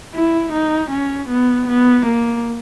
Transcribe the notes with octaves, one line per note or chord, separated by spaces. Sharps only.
E4
D#4
C#4
B3
B3
A#3